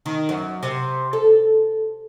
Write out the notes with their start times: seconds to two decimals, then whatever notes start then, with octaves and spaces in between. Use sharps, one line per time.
0.06 D#3
0.29 F#2
0.63 C3
1.13 A4